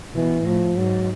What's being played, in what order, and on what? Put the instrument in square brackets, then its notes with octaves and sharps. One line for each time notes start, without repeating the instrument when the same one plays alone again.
[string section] B2 [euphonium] E3
[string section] A2 [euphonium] F3
[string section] G#2 [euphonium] F#3